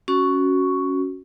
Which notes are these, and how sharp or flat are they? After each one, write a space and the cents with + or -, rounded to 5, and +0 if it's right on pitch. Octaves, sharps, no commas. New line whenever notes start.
C#4 +0 F#4 +0 C#6 +5